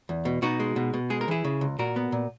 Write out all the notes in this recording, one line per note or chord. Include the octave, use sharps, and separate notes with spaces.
E2
B2
B2 D#4 F#4
G#3
B2
B2
G#3 G#4
A#4
E3 E4 G#4
C#3
C#2
A#2 F#4 A#4
B3
A#2